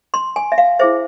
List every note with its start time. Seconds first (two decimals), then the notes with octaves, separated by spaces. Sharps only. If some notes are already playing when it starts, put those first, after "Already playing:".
0.14 C6
0.36 G#5
0.52 E5
0.58 F5
0.79 E4 G#4 C5 E5